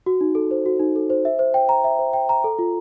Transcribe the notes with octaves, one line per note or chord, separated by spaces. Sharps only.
F#4
D#4
A4
C5
F#4
D#4
A4
C5
E5
C5
G5
A#5
E5
C5
G5
A#5
A4
F4